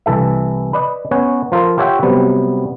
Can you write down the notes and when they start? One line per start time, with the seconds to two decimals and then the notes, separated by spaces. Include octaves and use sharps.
0.06 C2 E3 A4 E5
0.73 B4 D5 D#5
1.11 B3 C#4 C#5 F#5
1.52 F3 F4 A4 A#4
1.78 F4 G4 C#5 E5 F#5 G5
2.03 C3 F#3 G3 B3